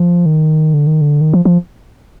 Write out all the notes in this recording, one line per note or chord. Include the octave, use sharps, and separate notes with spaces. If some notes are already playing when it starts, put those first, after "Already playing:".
Already playing: F3
D#3
D3
D#3
D3
D#3
F3
F3